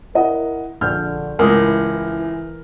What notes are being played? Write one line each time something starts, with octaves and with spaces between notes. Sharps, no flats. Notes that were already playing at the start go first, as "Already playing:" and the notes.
E4 A#4 D#5 F#5
A#1 D3 F6 G6
C#2 A2 E3 A#4 G#5 D#6